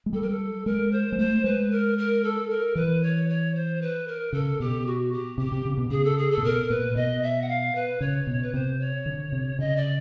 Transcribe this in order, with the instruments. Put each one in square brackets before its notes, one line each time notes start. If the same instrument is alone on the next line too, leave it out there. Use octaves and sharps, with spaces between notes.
[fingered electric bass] G#3
[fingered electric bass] G3 [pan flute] A4
[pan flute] A#4
A4
[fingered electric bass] G#3 [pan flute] A#4
[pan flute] C5
[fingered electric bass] G#3
[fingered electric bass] A3 [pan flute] C5
[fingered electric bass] G#3 [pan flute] B4
[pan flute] A#4
A#4
A4
A#4
[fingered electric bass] E3 [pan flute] B4
[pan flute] C#5
C#5
C5
B4
A#4
[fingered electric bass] C#3 [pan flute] A4
[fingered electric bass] B2 [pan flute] G4
[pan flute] F#4
G4
[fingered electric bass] C3 [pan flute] G4
[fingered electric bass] C3
C#3
B2
[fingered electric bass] C#3 [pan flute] G#4
[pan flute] A4
G#4
A4
[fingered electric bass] A#2
[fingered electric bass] B2 [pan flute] A#4
[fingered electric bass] A#2 [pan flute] B4
[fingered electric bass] B2 [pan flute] D#5
[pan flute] E5
F#5
F5
B4
[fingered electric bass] C#3 [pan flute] C#5
[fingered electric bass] B2
[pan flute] B4
[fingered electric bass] C3 [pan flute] C5
[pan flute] C#5
[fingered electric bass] D3
C3
[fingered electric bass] C#3 [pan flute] D#5
[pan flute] D5